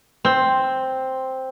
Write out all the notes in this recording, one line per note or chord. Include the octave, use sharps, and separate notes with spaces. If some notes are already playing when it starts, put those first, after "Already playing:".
C4